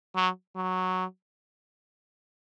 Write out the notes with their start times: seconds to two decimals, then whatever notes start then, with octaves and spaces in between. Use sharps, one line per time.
0.16 F#3
0.56 F#3